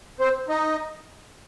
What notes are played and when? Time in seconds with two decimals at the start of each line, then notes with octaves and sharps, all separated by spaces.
0.20 C4 C5
0.49 D#4 D#5